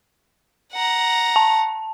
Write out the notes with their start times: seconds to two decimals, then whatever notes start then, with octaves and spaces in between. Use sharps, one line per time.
0.73 F#5 A#5
1.36 A5